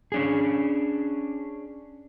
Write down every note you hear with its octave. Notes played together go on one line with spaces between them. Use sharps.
C#4 D4 G#4